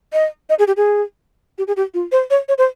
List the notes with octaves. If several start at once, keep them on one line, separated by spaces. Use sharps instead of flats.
D#5
D#5
G#4
G4
G#4
G4
G#4
G4
F4
C5
C#5
C#5
C5